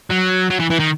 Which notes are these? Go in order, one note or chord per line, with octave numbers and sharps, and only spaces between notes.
F#3
F#3
E3
E3
D#3